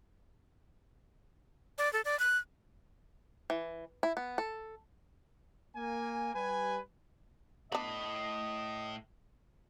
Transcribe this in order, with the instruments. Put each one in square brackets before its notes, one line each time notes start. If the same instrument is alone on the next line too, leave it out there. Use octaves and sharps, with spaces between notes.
[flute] D5
A4
D5
F#6
[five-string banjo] E3
E4
B3
A4
[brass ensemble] A#3 G#5
G3 B4 G#5
[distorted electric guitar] A2 B5 [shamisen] B3 D4 [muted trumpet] D#5